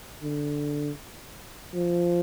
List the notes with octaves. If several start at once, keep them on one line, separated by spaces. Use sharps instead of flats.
D3
F3